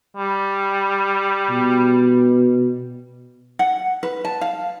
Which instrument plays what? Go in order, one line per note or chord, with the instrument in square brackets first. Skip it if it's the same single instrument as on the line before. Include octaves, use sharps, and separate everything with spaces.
[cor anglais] G3
[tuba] B2
[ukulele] F#5
B4
A5
F5